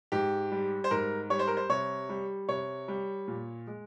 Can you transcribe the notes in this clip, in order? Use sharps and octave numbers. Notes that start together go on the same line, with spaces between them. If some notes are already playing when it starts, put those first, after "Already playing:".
G#2 G4
G3
C5
G#2 A#4
G3 C#5
C5
A#4
C5
C3 C#5
G3
C3 C#5
G3
A#2
G#3